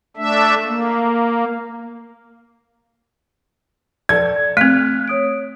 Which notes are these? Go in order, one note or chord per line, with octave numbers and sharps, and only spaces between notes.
A3 D4 E5
A#3
A4 D5 G#6
A3 C4 F6 F#6 B6
C#5 D#6 D7